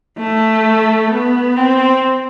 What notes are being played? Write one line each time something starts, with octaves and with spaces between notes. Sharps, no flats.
A3
B3
C4